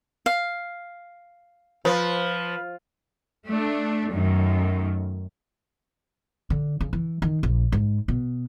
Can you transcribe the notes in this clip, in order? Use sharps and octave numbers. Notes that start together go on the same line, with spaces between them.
F5
F3 B4
A3 D4
F#2 D#3 A3
D3
C#3
E3
D#3
A#1
G#2
B2